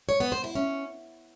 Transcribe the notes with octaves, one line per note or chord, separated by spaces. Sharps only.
C#5
B3
C5
E4
C#4